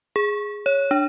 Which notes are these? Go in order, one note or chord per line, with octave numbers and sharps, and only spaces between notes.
G#4
C#5
D4